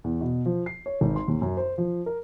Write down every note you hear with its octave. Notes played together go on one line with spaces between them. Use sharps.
E2
B2
F3
C7
C#5
G#1
C6
D#2
F#2
C5
F3
A#4